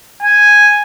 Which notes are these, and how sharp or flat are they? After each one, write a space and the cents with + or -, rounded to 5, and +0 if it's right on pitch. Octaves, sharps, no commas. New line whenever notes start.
G#5 -5